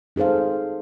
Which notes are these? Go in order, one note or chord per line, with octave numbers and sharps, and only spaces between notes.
D#4 G#4 A4 C5 F5